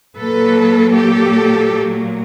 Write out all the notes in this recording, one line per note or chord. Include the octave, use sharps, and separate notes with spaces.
A#2 F#3 A#3 A4 B4
G4 A4